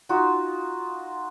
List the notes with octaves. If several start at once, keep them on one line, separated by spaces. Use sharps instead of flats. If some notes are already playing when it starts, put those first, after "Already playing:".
D#4 F4 F#4